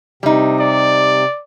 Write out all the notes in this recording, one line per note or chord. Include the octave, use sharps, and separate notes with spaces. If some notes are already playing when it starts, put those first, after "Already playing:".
C3 G3 D#4
D5